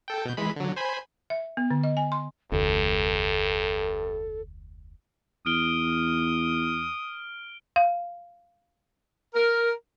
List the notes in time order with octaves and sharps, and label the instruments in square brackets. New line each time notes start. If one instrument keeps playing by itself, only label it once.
[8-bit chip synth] A4 G5
B2 G6
E3 G#3 B5
D3 F#3
C5 G#5 B5
[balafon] E5
B3
D3
D#5
G#5
C6
[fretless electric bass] F1 D2 D3 [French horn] G2 [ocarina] A4
[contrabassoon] E2 [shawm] D#6 [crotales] F6 D7 G7
[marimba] F5
[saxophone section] A#4